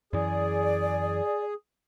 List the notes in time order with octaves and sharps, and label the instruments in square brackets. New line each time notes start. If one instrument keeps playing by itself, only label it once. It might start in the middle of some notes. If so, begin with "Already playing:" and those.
[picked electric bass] F#2 E3 [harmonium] G#4 [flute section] D5